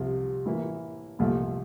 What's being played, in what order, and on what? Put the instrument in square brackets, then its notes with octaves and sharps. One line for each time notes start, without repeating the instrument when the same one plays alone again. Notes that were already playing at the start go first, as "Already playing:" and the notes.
Already playing: [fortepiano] C2 C3 F3
A2 E3 A#3 E4
C2 A#2 F3 A3